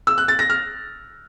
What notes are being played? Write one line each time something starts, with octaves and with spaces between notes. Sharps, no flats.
E6
F#6
A6
A#6
F6